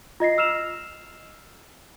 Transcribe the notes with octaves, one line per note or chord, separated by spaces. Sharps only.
F4 D#5 A#6 C7
E6 F6 C7 E7 F7